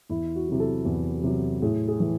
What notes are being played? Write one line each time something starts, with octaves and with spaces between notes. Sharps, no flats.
E2 E4
F#4
C3 F#3
A4
E2
C3 F#3
A2 G#4
G#4
E3